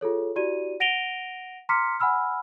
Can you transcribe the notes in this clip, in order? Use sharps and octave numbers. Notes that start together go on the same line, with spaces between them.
F4 G#4 A4 C#5
E4 F#4 G4 D5 D#7
F#5 A#6 D7 D#7 F7 G7
A#5 C6 D6 F6 B6 C#7
F#5 G#5 B5 E6 F6